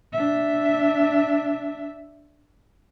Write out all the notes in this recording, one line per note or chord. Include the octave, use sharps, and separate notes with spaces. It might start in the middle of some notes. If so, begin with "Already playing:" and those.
D4 E5